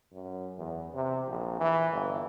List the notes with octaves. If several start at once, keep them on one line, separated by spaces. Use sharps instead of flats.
F#2
E2
C3
A#1
E3
G1